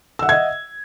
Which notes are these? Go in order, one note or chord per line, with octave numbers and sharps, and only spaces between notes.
D#5 E5 F#5 E6 G#6